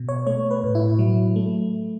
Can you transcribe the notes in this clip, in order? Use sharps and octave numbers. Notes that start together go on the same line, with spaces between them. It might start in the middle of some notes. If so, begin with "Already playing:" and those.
Already playing: B2
C#5
A3 C#5
B4
A2
E4
F#3
A3